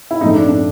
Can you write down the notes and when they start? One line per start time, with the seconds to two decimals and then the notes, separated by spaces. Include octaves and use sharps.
0.11 E4
0.21 A2 F3 A3 D#4
0.35 D4
0.49 D4